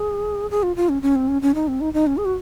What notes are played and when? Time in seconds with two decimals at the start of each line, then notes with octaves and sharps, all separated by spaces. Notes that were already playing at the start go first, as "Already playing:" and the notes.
Already playing: G#4
0.51 G#4
0.63 F4
0.76 F4
0.89 C#4
1.02 C#4
1.16 C4
1.28 C#4
1.42 C#4
1.55 D#4
1.68 C4
1.81 D#4
1.94 D#4
2.07 C#4
2.17 G#4
2.25 F#4